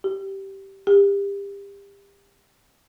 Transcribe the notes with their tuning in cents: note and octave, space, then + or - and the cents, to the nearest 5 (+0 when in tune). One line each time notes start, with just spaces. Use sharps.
G4 -10
G4 +30